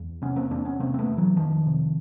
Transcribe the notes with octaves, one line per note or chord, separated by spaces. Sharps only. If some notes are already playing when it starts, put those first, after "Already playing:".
Already playing: E2
C3 B3 C#4
A#3 C4
E2 C4 D4
B3 C#4
C3 A#3 C4
C4
A3 B3
E2
E3 F#3
F2 D#3 F3
C3